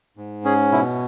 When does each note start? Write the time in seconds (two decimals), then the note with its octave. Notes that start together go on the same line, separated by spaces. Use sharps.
0.17 G#2
0.45 C#4 G#4
0.72 B2 E4